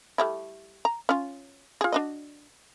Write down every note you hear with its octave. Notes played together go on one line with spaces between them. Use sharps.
G3 A3 E4
A#5
C#4 F4
F4 G#4
D4 F#4 D#5